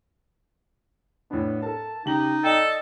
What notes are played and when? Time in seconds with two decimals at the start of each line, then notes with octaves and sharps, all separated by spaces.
1.31 A2 B3 D4
1.63 A4 A#4 A5
2.06 C#3 D#4 G4 F#7
2.44 A4 D5 D#5 G5